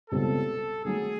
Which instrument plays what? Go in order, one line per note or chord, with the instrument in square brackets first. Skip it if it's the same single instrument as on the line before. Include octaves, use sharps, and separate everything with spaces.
[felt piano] C#2 B2 G3 C4 [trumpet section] A4
[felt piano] D#3 F#3 A3 [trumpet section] G#4